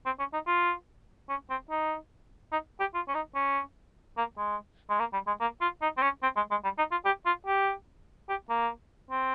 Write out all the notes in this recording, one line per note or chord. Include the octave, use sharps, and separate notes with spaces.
C4
C#4
D#4
F4
C#4
C4
D#4
D#4
G4
F4
C#4
D#4
C#4
A#3
G#3
G#3
A#3
G3
G#3
A#3
F4
D#4
C4
C#4
C4
G#3
G#3
G3
D#4
F4
G4
F4
G4
G4
A#3
C4